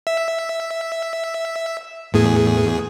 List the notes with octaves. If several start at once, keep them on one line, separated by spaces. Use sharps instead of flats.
E5
E2 A2 G#4